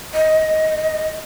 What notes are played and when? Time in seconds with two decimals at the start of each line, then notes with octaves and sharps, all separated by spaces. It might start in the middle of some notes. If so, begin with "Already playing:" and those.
0.15 D#5